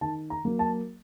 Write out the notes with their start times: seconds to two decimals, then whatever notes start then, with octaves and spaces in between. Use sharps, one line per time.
0.01 D#3 A5
0.30 A#5
0.45 F#3 A#3
0.59 A5